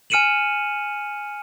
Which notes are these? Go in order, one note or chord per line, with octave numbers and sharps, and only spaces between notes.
G#5 F6 C#7 D#7 E7 F#7